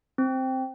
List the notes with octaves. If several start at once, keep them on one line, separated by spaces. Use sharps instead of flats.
C4